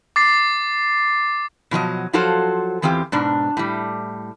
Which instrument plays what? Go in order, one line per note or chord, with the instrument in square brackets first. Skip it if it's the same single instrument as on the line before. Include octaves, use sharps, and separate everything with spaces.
[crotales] D6 A6 C7
[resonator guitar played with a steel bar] B2 F3 F#3 D#5
F3 F#3 F4 F#4 A4 C5
E2 E3 C4 F4 G4
G#2 B2 D4
A2 G3